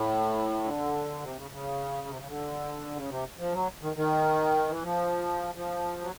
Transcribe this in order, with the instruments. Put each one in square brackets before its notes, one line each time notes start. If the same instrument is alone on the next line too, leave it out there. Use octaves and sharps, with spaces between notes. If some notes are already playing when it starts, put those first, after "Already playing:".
Already playing: [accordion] A2
D3
C3
C#3
C#3
C3
C#3
D3
C#3
C3
F3
F#3
D#3
D#3
E3
F3
F3
F#3